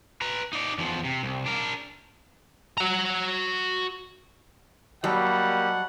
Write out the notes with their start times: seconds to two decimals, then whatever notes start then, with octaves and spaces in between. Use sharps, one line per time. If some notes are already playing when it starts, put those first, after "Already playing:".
0.22 B4 A#5
0.53 D#4 D5
0.78 E2 F3
1.04 C3
1.23 C2
1.46 D4 A#4
2.78 F#4 A#5
5.04 F#3 G3 A#3 D#5 F#5 A5 B5